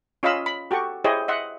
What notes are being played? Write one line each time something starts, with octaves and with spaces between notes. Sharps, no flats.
C#4 F4 D#5 F5 B5 E6
B5
F#4 G4 A4 C#6
E4 G4 G#4 C5 C#5 D#5
D#5 E5 F#5 C6